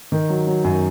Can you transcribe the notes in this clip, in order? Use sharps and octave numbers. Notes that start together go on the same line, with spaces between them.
D#3
F#3
F#3
F#2